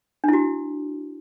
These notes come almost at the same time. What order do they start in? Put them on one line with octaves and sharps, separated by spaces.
D4 E4 F#4